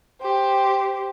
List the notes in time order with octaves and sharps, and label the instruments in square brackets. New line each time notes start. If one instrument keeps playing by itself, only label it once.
[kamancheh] G4 C5